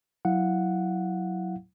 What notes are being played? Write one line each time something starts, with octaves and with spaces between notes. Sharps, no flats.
F#3 E4 F5 F#5